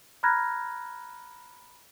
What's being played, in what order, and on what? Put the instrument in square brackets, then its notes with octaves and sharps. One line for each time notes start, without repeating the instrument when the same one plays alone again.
[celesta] A#5 B5 F6 F#6 G#6 A#6